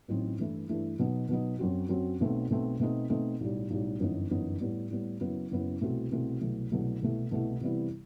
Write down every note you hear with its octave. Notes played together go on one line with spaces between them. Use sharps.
A1 A2 F#3 C4 D#4
G2 E3 A3 E4
G2 E3 A3 E4
B2 F#3 B3 D#4
B2 F#3 B3 D#4
F#2 F#3 C4 F#4
F#2 F#3 C4 F#4
B1 B2 A3 C4
B1 B2 A3 C4
B2 A3 C4 D#4
B2 A3 C4 D#4
B1 A2 G3
B1 A2 G3
G1 F#2 E3 B3 D#4
G1 F#2 E3 B3 D#4
A2 G3 B3
A2 G3 B3
F#1 F#2 F#3 B3 E4
F#1 F#2 F#3 B3 E4
C2 B2 A3 C4 F#4
C2 B2 A3 C4 F#4
C2 B2 F#3 A3
C2 B2 F#3 A3
C2 B2 A3 E4
C2 B2 A3 E4
C3 E3 G3 B3 E4